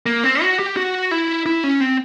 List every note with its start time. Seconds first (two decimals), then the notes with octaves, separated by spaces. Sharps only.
0.06 A#3
0.24 C4
0.42 F#4
0.59 G4
0.77 F#4
1.11 E4
1.46 E4
1.64 C#4
1.81 C4